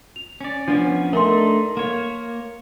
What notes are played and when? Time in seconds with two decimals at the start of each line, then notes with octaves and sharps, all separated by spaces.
0.16 F7
0.41 C#4 D5
0.68 F3 B3 C#4 D4
1.13 A3 D4 D#4 A#4 C6
1.77 A#3 C#5